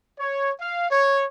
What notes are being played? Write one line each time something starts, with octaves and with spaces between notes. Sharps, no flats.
C#5
F5
C#5